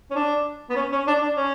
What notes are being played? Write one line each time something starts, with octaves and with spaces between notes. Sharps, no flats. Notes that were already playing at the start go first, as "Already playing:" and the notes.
C#4
D4
B3
C#4
C#4
D4
D4
C#4